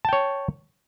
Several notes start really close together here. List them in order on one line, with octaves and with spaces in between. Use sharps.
A5 G5 C#5